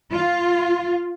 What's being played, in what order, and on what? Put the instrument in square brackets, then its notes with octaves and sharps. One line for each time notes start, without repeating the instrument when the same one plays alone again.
[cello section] F4